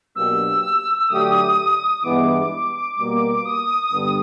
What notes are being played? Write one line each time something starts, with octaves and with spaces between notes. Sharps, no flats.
B2 F#3 A#3 D4 G4 E6
D3 F#3 A3 D4 G4 D#6
G2 E3 G#3 B3 D6
B2 G3 A#3
D#6
G2 D3 G3 B3 D4